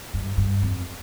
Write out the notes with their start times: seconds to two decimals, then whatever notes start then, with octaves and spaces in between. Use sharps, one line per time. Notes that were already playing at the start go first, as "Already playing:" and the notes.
0.14 G2
0.37 G2
0.62 F2